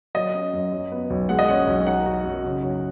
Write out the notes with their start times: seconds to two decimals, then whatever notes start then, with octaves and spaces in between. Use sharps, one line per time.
0.15 F#3 D#5
0.34 C#4
0.53 F#2
0.72 F#3
0.92 B3
1.10 B1
1.29 G#3 F#5
1.39 D#5
1.48 C#4 F#5
1.67 B1
1.87 D#4 F#5
2.06 F#4
2.25 F#2
2.44 C#3
2.63 F#3